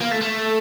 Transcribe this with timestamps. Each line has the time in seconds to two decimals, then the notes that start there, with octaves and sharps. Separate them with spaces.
0.01 A#3
0.11 A3
0.21 A3